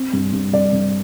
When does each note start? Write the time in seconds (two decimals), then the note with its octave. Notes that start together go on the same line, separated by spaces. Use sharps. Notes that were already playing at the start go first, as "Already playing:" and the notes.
Already playing: C4
0.13 G2
0.33 G2
0.53 G2 D5
0.73 G2